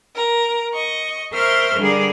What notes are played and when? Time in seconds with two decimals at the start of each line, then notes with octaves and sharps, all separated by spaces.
0.15 A#4
0.74 D#5 C#6
1.33 A#4 C5 E5 C6 C#6 F6
1.79 D3 G3 G#4 A#4 D5